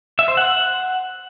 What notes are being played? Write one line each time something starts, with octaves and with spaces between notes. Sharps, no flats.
E5
C5
F#5